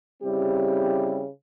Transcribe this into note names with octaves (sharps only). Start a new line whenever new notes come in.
C#3 G3 C4 E4 G4